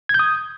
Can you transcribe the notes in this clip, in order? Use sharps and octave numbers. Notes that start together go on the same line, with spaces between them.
G#6
G6
D#6